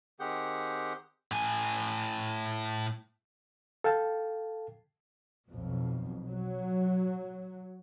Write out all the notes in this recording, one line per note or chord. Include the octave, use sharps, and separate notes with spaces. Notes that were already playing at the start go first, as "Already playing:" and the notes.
D#3 C4 G4 G#4 F#5 G6
A2 G#5
A4 F5 G5 A5
B1 F2 B2
F#3